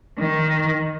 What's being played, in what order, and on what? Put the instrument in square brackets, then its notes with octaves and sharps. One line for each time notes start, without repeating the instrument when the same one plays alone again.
[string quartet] D#3